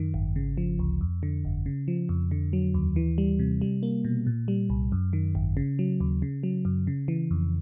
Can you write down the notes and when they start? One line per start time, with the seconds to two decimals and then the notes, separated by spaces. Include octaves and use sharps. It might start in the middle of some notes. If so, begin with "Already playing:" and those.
Already playing: F#2 D#3
0.14 G#1
0.36 C#3
0.58 F3
0.79 D2
1.01 F2
1.23 D3
1.45 G1
1.66 C#3
1.88 F3
2.09 F2
2.31 D3
2.53 F#3
2.74 D#2
2.96 E3
3.18 G3
3.39 C3
3.61 G3
3.83 A#3
4.05 B2
4.27 A#2
4.48 G3
4.70 C2
4.92 F#2
5.13 D#3
5.35 G#1
5.57 C#3
5.79 F#3
6.00 D#2
6.22 C#3
6.43 F#3
6.65 F#2
6.87 C#3
7.08 E3
7.31 F2